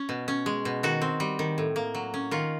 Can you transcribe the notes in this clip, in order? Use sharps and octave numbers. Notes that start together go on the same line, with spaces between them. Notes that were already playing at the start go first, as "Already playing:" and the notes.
Already playing: C#4
B2
C#4
G#3
B2
D#3 F#4
C4
G3
D#3
A2
A#3
F#3
C#4
D#3 F4